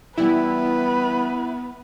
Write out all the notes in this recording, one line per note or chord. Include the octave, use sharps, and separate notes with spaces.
E3 G3 B3 E4 B4